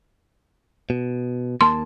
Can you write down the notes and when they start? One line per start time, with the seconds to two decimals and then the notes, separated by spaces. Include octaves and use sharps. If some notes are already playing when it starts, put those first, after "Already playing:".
0.90 B2
1.61 D#2 A#3 A5 C6